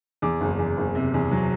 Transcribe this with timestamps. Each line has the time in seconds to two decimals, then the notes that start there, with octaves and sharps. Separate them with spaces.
0.22 E2 D6
0.41 F#1
0.59 E2
0.77 F#1
0.95 C3
1.14 E2
1.31 F#3